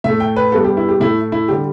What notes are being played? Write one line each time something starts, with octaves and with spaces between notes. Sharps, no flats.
A2 A3 E5
G5
B4
G2 G3 B3 A4
G4
E4
G4
A2 A3 E4
E4
D3 G3 G4